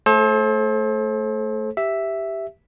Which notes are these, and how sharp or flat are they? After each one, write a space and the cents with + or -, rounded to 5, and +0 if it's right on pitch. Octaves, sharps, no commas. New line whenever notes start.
A3 +0 A4 -30 C5 +35
G4 +0 E5 +0